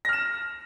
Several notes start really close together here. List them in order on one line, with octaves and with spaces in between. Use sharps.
A#6 F6 E7